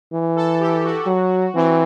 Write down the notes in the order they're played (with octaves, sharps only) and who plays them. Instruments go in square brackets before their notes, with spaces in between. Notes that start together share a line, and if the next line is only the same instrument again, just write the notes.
[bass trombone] E3
[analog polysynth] A4
G4
F#4
[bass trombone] F#3
[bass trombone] E3 [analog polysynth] C4